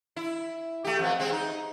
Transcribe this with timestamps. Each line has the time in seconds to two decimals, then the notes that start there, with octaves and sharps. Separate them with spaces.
0.16 E4
0.84 A3 G4
0.99 F2 B3
1.19 G#3 C4
1.32 D#4